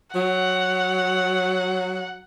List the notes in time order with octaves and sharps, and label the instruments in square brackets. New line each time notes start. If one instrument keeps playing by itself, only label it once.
[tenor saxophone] F#3 [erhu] F#5